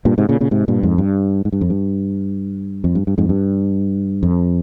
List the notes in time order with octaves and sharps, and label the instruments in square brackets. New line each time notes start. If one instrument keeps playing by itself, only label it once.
[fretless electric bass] G2 A#2
G#2 C3
A#2 C#3
A#2 C#3
G#2 C3
G2 A#2
F2 G#2
G2
G#2
G2
F2
G2
F2
G2
G2
F2 G#2
G2
F2